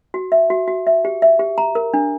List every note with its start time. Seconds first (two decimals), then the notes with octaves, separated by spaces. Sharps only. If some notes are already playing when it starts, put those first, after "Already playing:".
0.14 F#4
0.32 E5
0.50 F#4
0.68 F#4
0.87 E5
1.05 G4
1.22 E5
1.39 G4
1.58 A#5
1.75 A#4
1.94 D4